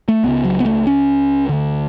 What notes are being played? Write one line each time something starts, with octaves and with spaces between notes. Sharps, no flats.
A3
C#2 C#3 B3
F#3
B3
A3
C#4
D2 D3